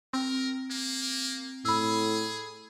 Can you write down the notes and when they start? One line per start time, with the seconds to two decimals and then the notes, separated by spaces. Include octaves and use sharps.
0.13 C4 A#4
0.71 A#3
1.65 A2 G#4 B5 E6